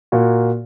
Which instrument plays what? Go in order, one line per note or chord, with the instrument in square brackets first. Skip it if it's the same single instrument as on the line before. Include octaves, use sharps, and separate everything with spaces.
[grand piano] A#2 A#3 F#4